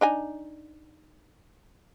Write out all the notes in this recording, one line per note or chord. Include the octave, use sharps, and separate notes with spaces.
D4 D#4 G#5